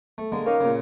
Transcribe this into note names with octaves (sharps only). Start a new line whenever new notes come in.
A3
D3 G#3 A#3
A#3 C#4 D#4
A#2 C#3